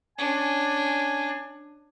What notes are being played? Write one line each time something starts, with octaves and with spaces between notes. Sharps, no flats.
C#4 D4 G#5